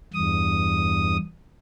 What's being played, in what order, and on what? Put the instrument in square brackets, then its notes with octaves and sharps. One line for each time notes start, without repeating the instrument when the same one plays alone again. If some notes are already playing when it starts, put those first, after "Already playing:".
[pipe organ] E2 G2 D#6